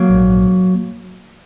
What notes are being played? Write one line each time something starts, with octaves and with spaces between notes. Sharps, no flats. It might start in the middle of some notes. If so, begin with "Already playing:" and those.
Already playing: F#3 A#3
A#1 G#2